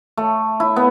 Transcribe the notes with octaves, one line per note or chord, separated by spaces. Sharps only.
A3
E4
B3